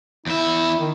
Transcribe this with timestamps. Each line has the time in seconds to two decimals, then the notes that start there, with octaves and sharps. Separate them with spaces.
0.26 E2 E4 E5
0.80 D#3